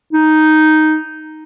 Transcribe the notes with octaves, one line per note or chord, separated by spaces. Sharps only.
D#4